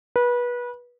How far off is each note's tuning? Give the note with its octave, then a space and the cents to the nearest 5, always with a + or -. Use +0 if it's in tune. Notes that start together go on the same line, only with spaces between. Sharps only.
B4 -25